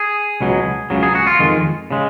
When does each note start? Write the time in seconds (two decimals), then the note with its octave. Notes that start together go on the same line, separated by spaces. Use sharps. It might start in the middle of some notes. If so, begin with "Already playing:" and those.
Already playing: G#4
0.41 C#2 B2 F#3
0.90 C#2 C#3 F#3
1.03 G#4
1.15 F#4
1.27 F4
1.39 F2 D#3 G#3
1.91 C#3 G#3